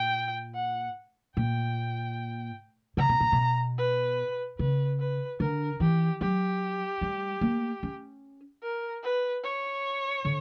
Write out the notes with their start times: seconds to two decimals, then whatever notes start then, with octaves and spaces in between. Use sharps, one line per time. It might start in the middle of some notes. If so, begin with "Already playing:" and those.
Already playing: A#2 G5
0.55 F#5
1.36 A#2 G5
2.97 C#3 A#5
3.09 B2
3.20 A#2
3.32 B2
3.78 B4
4.59 C#3 B4
5.00 B4
5.40 D3 A#4
5.80 E3 G4
6.21 F#3 G4
7.01 G3
7.41 A#3
7.83 C#4
8.63 A#4
9.03 B4
9.44 C#5
10.25 D3